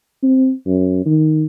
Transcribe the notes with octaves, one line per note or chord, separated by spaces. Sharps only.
C4
F#2
D#3